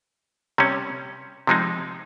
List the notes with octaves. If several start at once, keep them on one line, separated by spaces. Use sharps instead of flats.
C3 G3 C#4
C3 F3 G#3 D#4